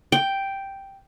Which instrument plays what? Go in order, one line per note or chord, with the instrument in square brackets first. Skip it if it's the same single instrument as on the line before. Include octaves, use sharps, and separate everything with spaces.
[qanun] G5